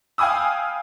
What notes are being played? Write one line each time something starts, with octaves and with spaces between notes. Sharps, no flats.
F5 G5 G#5 B5 D#6 E6